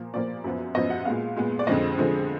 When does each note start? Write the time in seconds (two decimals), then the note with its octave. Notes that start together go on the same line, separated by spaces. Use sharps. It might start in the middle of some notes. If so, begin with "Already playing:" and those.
Already playing: A#2 F3 A#3
0.14 A#2 F3 A#3 D5
0.44 F#2 F3 B3
0.75 F#2 F3 B3 D#5
0.90 F#5
1.05 A#2 G#3 B3 F5
1.36 A#2 G#3 B3
1.59 D5
1.67 F2 D3 F3 G#3 D#5
1.98 F2 D3 F3 G#3